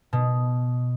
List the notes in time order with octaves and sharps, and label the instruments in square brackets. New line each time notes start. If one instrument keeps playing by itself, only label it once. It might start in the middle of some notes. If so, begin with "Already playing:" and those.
[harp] B2